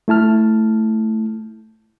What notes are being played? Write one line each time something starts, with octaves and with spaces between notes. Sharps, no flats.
A3 E4 A5 F6